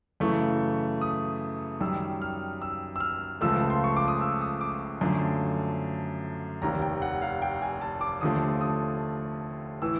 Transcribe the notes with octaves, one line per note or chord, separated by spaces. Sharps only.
F#2 C#3 E3 A3 C#6
D#6
F#2 D#3 G3 E6
F6
E6
E6
F6
C#2 C#3 F3 A3 E6
C6
C#6
D6
D#6
E6
D#6
D6
F#2 D3 F3 A3
F1 D#2 D#3 A#5
G5
F#5
F5
G5
G#5
A5
D6
D#2 D3 F3 A3 D#6
D#6
A2 E3 E6